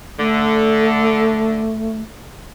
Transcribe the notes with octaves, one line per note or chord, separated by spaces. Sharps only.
D3 A3